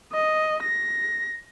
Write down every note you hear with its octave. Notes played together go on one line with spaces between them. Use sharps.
D#5
A#6